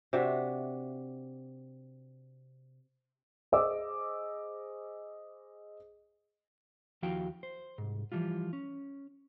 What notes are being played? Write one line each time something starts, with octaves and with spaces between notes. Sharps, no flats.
C3 D4 F#4 E5
G#4 C5 D#5 D6 E6
D#2 F3 E4 F#4 F5 G5
C5
C2 G#2
E3 F3 G3 F4
C#4